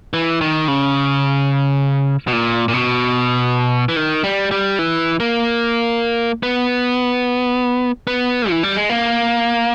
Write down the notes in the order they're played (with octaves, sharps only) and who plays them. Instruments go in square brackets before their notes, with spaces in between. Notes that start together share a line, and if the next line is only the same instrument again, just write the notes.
[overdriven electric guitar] E3
D#3
C#3
B2
A#2
A#2
B2
E3
D#3
G3
G3
E3
A#3
B3
B3
E3
G3
G#3
A#3